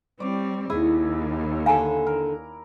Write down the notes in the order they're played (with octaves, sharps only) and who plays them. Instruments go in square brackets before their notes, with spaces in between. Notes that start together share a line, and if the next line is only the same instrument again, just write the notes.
[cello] G3 C4 [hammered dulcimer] C#5 D5
[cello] D#2 [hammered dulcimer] E4 [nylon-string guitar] G#4
[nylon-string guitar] D3 A4 [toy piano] F5 G#5 A#5
[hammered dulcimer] A#4